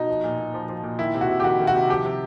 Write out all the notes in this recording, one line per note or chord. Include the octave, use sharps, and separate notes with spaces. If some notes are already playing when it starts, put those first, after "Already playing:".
Already playing: B2 D#4
F3
A#2
A#2
F3
F3
A#2
D#3 E4
C3
F#4
C3
G4
D#3 F#4
D#3
F#4
C3
F3 G4
C3